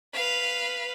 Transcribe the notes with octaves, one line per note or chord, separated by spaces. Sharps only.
B4 F5